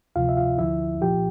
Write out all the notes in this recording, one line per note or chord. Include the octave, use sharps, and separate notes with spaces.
D2 C3 F3 F4 F5
E5
F4 F5
D2 D3 F3 E4 E5
C2 A#2 F3 G4 G5